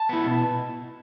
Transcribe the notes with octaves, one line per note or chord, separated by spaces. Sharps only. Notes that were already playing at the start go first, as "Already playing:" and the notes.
Already playing: A5
B3 E4
B2